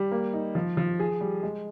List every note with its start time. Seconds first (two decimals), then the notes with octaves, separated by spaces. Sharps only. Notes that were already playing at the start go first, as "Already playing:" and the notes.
Already playing: G3
0.11 A#3
0.33 D#4
0.55 F3
0.77 F3
1.00 G#4
1.21 G3
1.43 G#3